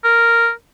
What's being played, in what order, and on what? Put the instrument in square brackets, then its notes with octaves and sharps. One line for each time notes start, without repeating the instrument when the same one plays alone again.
[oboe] A#4